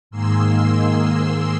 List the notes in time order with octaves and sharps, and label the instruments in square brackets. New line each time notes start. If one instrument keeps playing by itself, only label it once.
[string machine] G#2 D#3 A#3 G#4 C6 E6